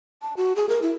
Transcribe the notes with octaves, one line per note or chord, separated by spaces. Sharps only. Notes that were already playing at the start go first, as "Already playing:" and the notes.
A5
F#4
G#4
A#4
E4